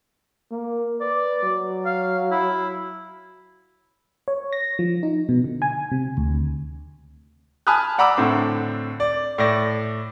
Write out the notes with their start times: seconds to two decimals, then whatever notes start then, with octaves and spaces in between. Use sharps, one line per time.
0.51 A#3
1.01 B4 D5
1.43 F#3
1.85 F5
2.31 E4
4.28 C#5
4.53 A#6
4.79 F3
5.03 D#4
5.29 B2
5.44 D3
5.62 G#5
5.91 C3
6.17 D2
7.67 G#5 A5 B5 D#6 F6 F#6
7.98 D5 F#5 A#5 B5 D6 E6
8.17 A2 D3 C4
9.00 D5
9.38 A2 D5 A#6